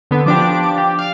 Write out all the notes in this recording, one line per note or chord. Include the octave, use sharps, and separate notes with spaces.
D3 B3
F3 D4 G4 D6
G4
F5